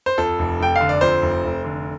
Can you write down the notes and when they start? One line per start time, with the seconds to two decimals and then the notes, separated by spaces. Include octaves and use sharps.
0.06 C5
0.18 F2 A4
0.39 F1
0.60 F1 G5
0.76 D3 F5
0.89 D5
1.01 F2 C5
1.22 F1
1.44 F1
1.64 D3